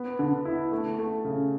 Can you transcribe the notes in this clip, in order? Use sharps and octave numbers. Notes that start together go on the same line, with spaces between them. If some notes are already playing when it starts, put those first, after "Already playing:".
Already playing: B3
D3
E4
A3
A3
C#3